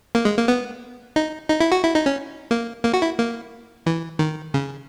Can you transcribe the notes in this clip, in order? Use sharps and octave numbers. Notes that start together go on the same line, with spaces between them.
A#3
G#3
A#3
B3
D#4
D#4
E4
F#4
E4
D#4
C#4
A#3
A#3
F#4
E4
A#3
E3
D#3
C#3